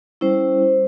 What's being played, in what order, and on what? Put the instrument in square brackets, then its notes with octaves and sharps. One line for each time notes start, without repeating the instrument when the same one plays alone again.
[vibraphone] G3 C#4 E4 C5